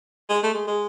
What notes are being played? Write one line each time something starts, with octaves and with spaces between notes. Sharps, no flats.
G#3
A3
G#3
G#3